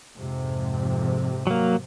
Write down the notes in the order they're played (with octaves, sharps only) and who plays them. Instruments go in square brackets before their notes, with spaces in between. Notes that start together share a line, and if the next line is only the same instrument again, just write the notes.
[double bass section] F2 G#2 C3
[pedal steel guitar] F#3 A#3